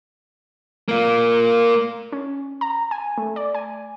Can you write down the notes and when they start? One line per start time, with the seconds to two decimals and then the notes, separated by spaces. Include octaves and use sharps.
0.89 A#3 F4
2.12 C#4
2.61 A#5
2.91 G#5
3.18 A3
3.36 D5
3.55 G#5